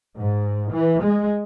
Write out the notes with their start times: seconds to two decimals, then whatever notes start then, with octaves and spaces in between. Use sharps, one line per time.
0.17 G#2
0.71 E3
1.02 G#3